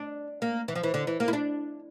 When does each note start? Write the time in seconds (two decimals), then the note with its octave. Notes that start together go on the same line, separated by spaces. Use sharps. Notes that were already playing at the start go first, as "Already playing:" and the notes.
Already playing: D4
0.42 A#3
0.68 E3
0.75 F3
0.83 E3
0.94 D3
1.07 E3
1.20 A#3
1.28 E4
1.33 D4